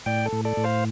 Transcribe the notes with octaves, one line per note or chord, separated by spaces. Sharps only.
A2 D5 G5
A4
A2
A4 D5
A2
C5 F5